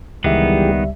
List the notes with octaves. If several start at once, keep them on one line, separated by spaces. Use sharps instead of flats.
C#2 D#3 E3 G3 G#3 B3 G4 E5